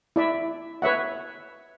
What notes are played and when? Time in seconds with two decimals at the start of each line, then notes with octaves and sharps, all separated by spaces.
0.16 E4 D5 E5
0.82 B4 C#5 E5 F#5